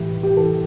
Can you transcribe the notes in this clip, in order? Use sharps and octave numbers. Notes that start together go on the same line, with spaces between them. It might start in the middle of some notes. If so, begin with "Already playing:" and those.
Already playing: A2 E3 G4
G4
E3 A4